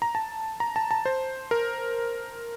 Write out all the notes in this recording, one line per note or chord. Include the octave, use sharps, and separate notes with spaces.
A#5
A5
A#5
A5
A5
C5
A#4